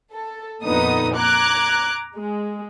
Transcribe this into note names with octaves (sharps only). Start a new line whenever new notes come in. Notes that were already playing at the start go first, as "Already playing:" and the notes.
A4
F2 A#2 D3 B3 D#4 D#6
A#5 D6 F#6 G#6
G#3